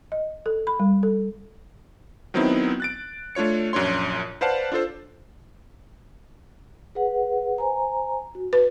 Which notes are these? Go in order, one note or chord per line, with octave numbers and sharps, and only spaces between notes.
D#5
A4
B5
G3
A4
D#3 F#3 B3 C4 D#4 E4
F#6 A6 D7
A3 D4 F4 C#5 C#7
A#1 F#2 D4 C#5 C6
B4 C5 D5 F5 F#5 A5
D4 F4 A4 C5
G#4 B4 F#5
C5 G#5 A#5
F#4
B4